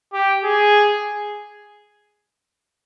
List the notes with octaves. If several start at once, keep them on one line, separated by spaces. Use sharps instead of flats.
G4
G#4